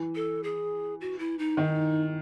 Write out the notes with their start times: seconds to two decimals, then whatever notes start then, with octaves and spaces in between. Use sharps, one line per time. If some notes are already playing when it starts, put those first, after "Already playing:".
Already playing: E3
0.15 A4
0.44 G#4
1.01 F#4
1.19 E4
1.39 D#4
1.57 D#3